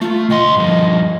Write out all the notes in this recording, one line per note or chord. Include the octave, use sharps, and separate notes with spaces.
A3 F4
D2 D#5 C6
G2 F3